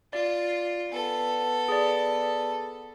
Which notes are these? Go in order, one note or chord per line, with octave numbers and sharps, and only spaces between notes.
F4 D5
B3 A4
G#4 D5